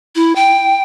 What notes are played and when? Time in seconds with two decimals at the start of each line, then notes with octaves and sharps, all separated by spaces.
0.16 E4
0.36 G5